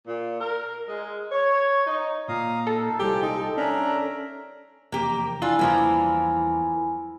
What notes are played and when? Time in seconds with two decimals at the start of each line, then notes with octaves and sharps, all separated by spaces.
0.07 A#2
0.41 A#4
0.89 G#3
1.32 C#5
1.87 D#4
2.28 A#2 F5 A#5 D#6
2.67 D#4 A4
2.99 C2 A#2 F3 G#3 G4
3.23 D#4
3.57 C#4 D4 A#4 E5 A#5
4.92 F1 E2 A#3 G4
5.42 D4 E4 F4 G#5 B5
5.59 E2 E3 F3 G3 A#3